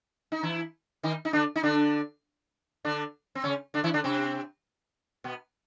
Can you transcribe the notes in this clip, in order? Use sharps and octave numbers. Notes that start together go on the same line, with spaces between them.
D#4
E3 E4
D#3 D#4
D#4
D3 D4
D#4
D3 D4
D3 D4
C4
C#3 C#4
D3 D4
E3 E4
D3 D4
C3 C4
B2 B3